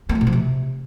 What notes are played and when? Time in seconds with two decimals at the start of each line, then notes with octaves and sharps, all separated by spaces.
0.09 A#3
0.15 A3
0.21 B2
0.27 F3
0.33 C3